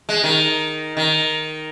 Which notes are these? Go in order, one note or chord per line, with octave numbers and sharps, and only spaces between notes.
G#3
D#3
D#3